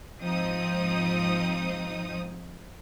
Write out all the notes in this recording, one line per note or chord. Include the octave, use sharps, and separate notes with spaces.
G#2 F3 C4 D#4 D#6